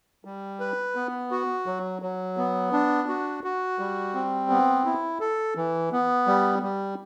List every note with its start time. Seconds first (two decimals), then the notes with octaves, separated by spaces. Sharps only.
0.25 G3
0.60 B4
0.95 B3
1.31 F#4
1.66 F#3
2.02 F#3
2.37 B3
2.72 D4
3.08 F#4
3.44 F#4
3.79 G3
4.14 C4
4.50 B3
4.85 E4
5.21 A4
5.56 E3
5.92 B3
6.27 G3
6.63 G3